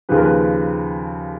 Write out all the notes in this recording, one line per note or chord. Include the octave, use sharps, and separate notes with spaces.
D#2 C#3 F3 B4
A#4
B4